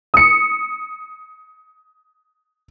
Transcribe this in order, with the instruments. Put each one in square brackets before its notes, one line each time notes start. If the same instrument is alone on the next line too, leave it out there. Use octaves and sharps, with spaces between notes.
[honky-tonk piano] D#6 C#7